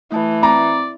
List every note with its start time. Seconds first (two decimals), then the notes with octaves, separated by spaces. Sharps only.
0.12 E3 A3 A5
0.43 C4 D5 A#5